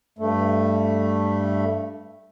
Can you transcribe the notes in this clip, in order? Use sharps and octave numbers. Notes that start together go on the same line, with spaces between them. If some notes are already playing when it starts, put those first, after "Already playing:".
G2 A3